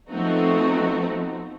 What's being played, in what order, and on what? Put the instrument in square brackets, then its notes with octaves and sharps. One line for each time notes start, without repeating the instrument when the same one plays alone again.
[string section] F3 A3 B3 C4 D#4 F#4